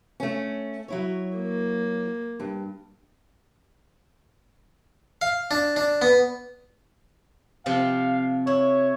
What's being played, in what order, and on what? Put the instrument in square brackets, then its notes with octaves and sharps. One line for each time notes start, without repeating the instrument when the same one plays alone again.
[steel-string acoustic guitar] A3 C#4
F#3 E4 C#5
[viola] A#3
[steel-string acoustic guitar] G2
[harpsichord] F5
D4
D4
B3
[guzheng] C3 F3 C4 [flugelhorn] F5
[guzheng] E4 [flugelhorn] C#5